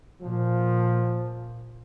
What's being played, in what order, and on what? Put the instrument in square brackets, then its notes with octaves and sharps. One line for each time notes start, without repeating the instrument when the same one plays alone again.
[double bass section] A#2 [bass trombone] F3